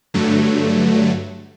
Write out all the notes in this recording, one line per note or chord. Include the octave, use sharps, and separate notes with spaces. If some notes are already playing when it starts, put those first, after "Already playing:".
G2 D3 F#3 A3